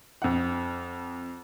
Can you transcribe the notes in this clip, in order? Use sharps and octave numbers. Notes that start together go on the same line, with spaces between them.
F2 F#5